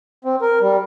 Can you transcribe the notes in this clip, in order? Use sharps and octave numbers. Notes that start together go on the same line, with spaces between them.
C4
A#4
G3